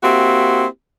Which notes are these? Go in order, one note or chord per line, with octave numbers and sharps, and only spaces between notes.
A#3 C4 E4 F#4 G4